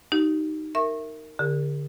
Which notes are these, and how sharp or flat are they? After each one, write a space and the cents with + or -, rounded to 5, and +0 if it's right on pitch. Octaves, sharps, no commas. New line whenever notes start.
D#4 +0 G4 -35
A#4 -15 E5 +0 C#6 -30
D3 -20 G4 +40 A#4 +0